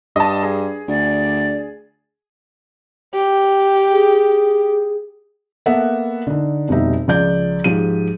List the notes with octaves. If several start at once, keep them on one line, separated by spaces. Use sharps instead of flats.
G2 D#5 A5
G#4
D2 D5
G4
G#4
A#3 B3 A4 A#4 E5 F#5
D3 D#4
F1 B2 G3 D#4 E5
C#2 F3 D5 G6
G#2 F3 G4 D#7